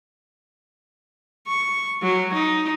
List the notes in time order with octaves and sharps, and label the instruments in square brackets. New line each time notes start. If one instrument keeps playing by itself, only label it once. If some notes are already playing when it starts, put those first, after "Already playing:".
[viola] C#6
F#3
D#4